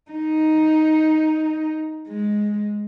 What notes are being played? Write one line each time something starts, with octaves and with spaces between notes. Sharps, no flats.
D#4
G#3